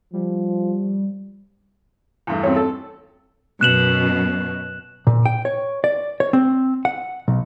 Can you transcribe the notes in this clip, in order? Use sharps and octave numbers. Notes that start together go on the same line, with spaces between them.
F3 G3
E2 G2 A3
C4 C#5
A4
F#2 B2 F#6 E7 F#7
A#2
G5
C#5
D5
C#5
C4
F#5
B1